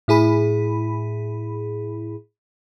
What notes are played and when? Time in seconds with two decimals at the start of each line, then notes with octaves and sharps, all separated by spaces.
0.08 A2 E4 G#4 B5